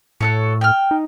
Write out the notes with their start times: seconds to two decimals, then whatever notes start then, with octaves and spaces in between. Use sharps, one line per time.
0.21 A2 F#4 A4 C#5
0.61 G5 F6
0.91 D#4